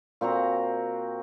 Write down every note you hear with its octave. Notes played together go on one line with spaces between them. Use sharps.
A#2 C4 F#4 A#5